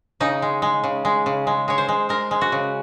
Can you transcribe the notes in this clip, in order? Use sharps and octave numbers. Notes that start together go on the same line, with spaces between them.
C#3 D#4
G#3
G#3
C#3
G#3
C#3
G#3
G#3 C#5
C5
G#3
G#3 A#4
G#3
F#4
C#3